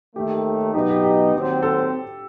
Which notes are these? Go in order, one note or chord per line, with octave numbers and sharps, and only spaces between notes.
D#2 D#3 A3 G4
B2 F#3 B3 D#4 G4
G4
G4
D#2 D#3 F#3 C4 F#4
A4